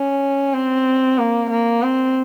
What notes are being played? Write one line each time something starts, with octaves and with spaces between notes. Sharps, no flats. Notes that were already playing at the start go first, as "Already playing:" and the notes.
Already playing: C#4
C4
A#3
A#3
C4